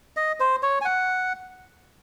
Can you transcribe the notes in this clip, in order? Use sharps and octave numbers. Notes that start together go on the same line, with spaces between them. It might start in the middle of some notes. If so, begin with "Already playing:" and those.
D#5
C5
C#5
G#5
F#5